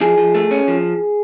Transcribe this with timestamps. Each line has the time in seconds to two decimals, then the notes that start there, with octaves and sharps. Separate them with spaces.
0.01 F3 G#4
0.18 F3
0.35 A3
0.51 C#4
0.68 F3